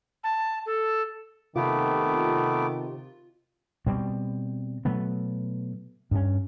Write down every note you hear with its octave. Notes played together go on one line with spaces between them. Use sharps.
A5
A4
C3 D#3 A3 B3 F4 D6
B2 G3 C4
B2 F#3 A3 B3
G2 C#4